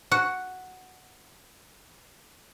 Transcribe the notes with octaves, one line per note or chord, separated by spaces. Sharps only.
F#4 F#5